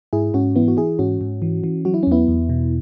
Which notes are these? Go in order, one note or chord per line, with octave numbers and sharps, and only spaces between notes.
G#2 E4 G#4
G#2 C#4 F#4
E3 B3 E4
F#4
E3 E4 G#4
G#2 C#4 F#4
G#2
E3
E3
F#3 F#4
E4
C#4
E2 B3 E4
E2
B2